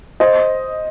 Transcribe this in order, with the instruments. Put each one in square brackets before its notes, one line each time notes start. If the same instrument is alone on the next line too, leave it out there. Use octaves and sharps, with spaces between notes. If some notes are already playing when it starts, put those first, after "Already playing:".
[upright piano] C5 D#5